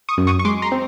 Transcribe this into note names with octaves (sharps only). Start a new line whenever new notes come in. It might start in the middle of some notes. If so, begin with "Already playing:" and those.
C#6 D#6
F#2
C#6 D#6
C#6
G#3 C6 D6
A#5 C6
C4